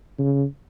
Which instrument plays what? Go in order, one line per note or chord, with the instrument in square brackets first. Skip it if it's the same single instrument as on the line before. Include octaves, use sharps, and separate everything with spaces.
[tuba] C#3